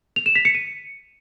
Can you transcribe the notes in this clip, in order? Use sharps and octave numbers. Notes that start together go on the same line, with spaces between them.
F7
E7
B6
C#7
D#7